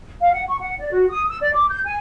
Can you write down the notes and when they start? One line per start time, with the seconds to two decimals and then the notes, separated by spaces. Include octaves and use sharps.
0.20 F5
0.32 F#5
0.49 C#6
0.60 F#5
0.79 D5
0.92 F#4
1.09 D#6
1.29 E6
1.40 D5
1.54 D6
1.71 G6
1.85 G#5